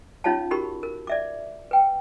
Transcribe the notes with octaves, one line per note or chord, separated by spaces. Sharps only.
C#4 D#4 F4 C#5 F5 A5
D#4 F#4 G4 A#4 B5 C#6
A#4
D5 E5 D6
B4 G5